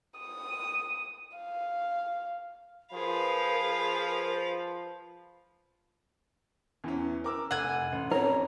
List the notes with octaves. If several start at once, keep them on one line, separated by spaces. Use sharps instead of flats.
D#6
F5
F3 G#4 A#4 B4 F5 B5
E2 E3 C#4
A#4 D6 E6
F1 F#5 G#5
A1
F2 C#4 A#4 C#5